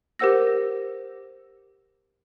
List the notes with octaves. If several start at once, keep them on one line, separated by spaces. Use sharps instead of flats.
G4 A#4 C5 F#5 E6 A#6